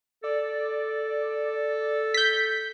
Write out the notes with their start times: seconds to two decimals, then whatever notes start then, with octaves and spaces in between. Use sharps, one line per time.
0.24 A4 D5
2.14 G6 B6